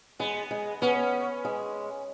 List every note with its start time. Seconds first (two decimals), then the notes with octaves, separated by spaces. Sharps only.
0.19 G#3 B3
0.51 G#3
0.82 B3 C#4
1.45 G#3